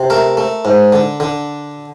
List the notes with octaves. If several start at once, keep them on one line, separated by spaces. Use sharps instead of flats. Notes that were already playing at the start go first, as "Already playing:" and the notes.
Already playing: C3
A3 A#4
A3
G#2
D3
D3